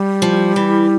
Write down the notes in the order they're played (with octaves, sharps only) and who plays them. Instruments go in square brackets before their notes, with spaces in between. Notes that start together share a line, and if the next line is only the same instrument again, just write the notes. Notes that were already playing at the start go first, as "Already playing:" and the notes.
Already playing: [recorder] G3
[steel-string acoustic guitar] F3
E3